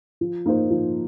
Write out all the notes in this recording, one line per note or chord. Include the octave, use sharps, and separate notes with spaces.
F3
A#3 D#4 C5
F3